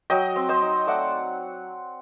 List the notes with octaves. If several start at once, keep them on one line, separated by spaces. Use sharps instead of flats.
F#3 D#5 G5
C4
C5 D#5
D#4
A3 D5 F#5